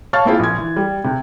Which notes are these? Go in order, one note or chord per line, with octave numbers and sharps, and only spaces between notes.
C#5 F5 A5 C#6 F6 A6
A#3 C4 E4 F4 G#4
A#1 G#6
E3
G3
C3